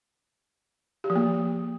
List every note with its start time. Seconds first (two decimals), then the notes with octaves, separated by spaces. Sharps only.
1.04 G4
1.10 F3
1.16 A#3